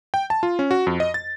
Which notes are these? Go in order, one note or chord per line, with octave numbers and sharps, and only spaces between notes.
G5
A5
F4
C#4
F#4
F2
D#5
A6